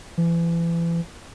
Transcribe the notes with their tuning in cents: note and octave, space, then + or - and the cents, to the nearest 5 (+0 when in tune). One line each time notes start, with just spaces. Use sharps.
E3 +35